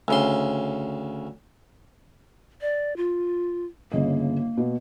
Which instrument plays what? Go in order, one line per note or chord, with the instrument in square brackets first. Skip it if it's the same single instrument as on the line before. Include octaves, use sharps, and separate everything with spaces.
[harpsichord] D2 C#3 C6
[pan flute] D5
F4
[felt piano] G1 C#3 D#5 [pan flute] A#3
[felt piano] B2